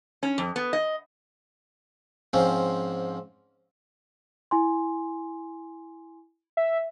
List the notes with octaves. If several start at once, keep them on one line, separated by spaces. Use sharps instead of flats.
C#4
F2
B3
D#5
G#2 F3 C4 C#4
E4 G#5 C6
E5